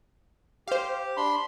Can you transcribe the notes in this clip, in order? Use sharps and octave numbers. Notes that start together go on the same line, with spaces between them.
G4 C5 F5
D4 B5 C6